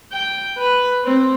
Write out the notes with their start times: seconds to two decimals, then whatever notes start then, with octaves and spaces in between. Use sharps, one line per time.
0.12 G5
0.58 B4
1.05 C4